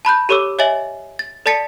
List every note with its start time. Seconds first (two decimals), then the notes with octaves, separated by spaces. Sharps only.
0.05 A5 B5 F#6 G6
0.29 G4 A4 C#5 C#6 D6 E6
0.59 C#5 D#5 E5 G#5 A6 F#7
1.19 A6
1.46 A4 D5 A5 A6 B6 C#7